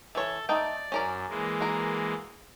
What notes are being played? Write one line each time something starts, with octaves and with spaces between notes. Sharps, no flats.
E3 A4 C#5
A3 D#4 D5 G5
F#2 C#4 A#4 D5
E3 G#3 A#3
F#4 A#4